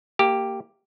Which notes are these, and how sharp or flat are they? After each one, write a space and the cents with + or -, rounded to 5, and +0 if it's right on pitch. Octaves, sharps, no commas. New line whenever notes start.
A#3 -20 G4 +0